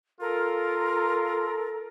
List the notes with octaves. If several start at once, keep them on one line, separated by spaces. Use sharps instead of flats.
F4 A4 A#4